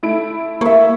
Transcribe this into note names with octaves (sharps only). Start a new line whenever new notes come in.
A3 E4 D7
A#3 C#5 E5